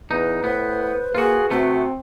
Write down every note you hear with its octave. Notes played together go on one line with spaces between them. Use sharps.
E2 D#4 B4
A2 B3 C5
A#3 F4 F#4 G#4
C3 A3 B3 C4 F#4